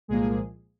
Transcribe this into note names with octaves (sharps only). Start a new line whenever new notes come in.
C2 A#2 F3 G#3 A#3 G#4